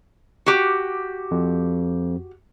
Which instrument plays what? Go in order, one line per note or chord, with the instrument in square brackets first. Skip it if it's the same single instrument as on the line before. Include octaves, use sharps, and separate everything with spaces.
[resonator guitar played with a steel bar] F#4 G4
[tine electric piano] F2